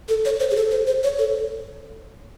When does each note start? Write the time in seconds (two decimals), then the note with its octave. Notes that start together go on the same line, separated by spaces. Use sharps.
0.09 A4
0.25 C#5
0.40 C5
0.51 G#4
0.56 A4
0.71 C5
0.87 C5
1.03 C#5
1.19 A4